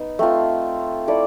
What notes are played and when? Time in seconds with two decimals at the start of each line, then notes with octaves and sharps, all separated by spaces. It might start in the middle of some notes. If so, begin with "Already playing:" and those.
Already playing: B3 D#4
0.19 A3 C4 F4
1.08 E4 A4 D5